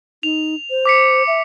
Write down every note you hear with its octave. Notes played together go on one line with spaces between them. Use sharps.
D#4 F7
C5
D6 B6 C#7
E5